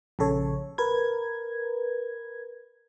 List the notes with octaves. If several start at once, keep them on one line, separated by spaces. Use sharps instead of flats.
A#1 C#3 A4 C#5
A#4 B4 G#6